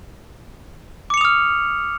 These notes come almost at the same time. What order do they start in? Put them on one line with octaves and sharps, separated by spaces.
D6 C#7 F7 D#6 F6